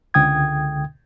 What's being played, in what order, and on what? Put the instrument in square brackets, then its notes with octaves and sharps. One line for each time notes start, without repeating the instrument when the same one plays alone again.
[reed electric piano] C#2 D3 G5 D#6 G#6